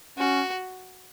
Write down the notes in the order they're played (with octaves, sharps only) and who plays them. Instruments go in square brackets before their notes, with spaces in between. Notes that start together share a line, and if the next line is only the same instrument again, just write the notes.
[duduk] C#4 [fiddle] F#4